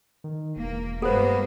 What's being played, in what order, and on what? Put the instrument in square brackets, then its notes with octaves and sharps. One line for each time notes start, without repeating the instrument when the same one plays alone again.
[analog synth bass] D#3
[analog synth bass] E1 [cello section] A#3
[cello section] G2 G#3 A#3 [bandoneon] B3 [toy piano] A4 C5